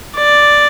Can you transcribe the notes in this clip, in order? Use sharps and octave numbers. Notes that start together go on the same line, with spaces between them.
D5